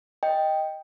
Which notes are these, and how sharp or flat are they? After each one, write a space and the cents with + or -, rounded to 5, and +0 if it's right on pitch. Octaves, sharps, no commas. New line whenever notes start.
D#5 +0 G5 +0